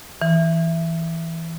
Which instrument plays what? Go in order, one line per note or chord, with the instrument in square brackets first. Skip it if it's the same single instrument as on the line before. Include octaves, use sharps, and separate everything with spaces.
[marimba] E3